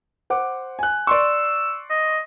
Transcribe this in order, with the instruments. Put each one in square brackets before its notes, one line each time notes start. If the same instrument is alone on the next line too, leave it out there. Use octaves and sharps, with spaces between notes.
[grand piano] C5 F#5 D6
G#5 F#6
[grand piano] D5 C6 C#6 [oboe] E6
[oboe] D#5